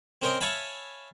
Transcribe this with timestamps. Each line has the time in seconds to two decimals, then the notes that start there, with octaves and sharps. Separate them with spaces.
0.22 C4 C#4 A#4 C5 D#5
0.41 C#5 E5 F5 G#5 A5 B5